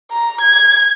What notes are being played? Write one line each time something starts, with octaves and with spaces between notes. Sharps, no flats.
A#5
G#6